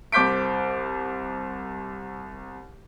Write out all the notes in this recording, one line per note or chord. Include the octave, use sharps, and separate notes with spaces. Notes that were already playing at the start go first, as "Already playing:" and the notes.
C2 C5 D6 G6 B6 D7